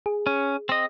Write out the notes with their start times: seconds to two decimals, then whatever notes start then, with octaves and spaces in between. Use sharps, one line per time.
0.06 G#4
0.26 C#4
0.69 C4 D#5